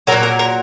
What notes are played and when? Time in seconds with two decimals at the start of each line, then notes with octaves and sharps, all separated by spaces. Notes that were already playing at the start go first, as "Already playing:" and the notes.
0.07 F#3 A#4
0.12 A#2
0.23 A#4
0.39 A#4